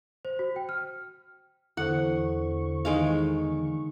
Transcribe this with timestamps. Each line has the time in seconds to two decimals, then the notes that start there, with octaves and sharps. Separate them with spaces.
0.25 C5
0.39 F#4
0.56 G5
0.69 F6
1.77 E2 D3 E4 A4 C5 F#5 C#6
2.85 D#3 G#3 F5